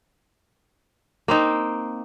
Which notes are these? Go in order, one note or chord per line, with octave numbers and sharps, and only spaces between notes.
A#3 C4 D#4